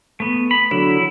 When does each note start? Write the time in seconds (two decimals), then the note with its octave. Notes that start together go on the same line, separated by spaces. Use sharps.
0.20 A3 B3
0.51 B5
0.71 D3 F#3 E4